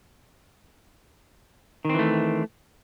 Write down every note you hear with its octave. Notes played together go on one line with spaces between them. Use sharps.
D#3 E3 A3 C4